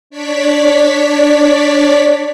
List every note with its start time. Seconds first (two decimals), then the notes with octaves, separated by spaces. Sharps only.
0.10 D4 C#5 D5 B6